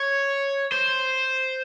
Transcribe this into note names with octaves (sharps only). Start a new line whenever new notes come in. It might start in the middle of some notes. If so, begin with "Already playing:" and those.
Already playing: C#5
C5